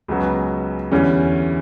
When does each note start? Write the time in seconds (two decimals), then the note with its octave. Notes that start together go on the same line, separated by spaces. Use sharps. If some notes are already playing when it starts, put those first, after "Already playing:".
0.08 C#2 C#3 F#3 B3
0.92 E2 D3 G3 C#4